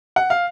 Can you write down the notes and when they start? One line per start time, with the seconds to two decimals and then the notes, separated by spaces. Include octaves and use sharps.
0.16 F#5
0.30 F5